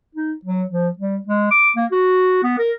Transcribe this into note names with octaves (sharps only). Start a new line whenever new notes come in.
D#4
F#3
F3
G3
G#3
D6
A#3
F#4
B3
A#4